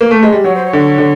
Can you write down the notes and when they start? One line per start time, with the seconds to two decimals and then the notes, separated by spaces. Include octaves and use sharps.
0.01 A#3
0.11 A3
0.23 G#3
0.32 G3
0.44 F#3 C#5
0.55 C5
0.65 C#5
0.73 D3
0.98 D3